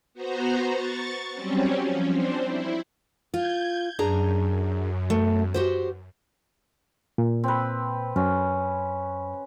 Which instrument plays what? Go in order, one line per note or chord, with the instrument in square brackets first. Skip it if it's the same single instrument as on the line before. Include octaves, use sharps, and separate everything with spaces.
[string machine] B3 F#4 C5 A#5
C#6 A6
F#3 G3 C4 C#4
F3 C#4
C4 D4 C5
E4
[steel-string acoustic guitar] F4 [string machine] G6 G#6
[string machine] F#2 [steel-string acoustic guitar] D4 G#4 A#5
[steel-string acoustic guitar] A3
F#4 G4 C5
[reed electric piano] A#2
[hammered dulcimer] C4 B4
[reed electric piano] F#2 [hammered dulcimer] C#4